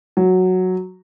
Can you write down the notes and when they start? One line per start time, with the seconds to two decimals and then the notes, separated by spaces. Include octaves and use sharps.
0.17 F#3